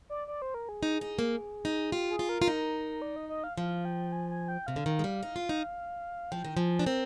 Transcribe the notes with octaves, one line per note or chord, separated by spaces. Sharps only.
D5
D5
C5
A#4
G#4
D#4
D#4
A#3
D#4
F4 G4
G#4
F4
A#4
F4
D#4
D5
D#5
D#5
F5
F3 F5
G5
G#5
G#5
G5
C3 F5
D3
D#3
G#3
G3
D#4
F4
D#4
F3 G5
D#3
F3 G#5
D4
C4 A#4